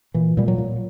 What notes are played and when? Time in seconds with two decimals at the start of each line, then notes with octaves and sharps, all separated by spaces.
0.14 A#2 E3
0.37 A#2 G3
0.48 F#3
0.58 A#2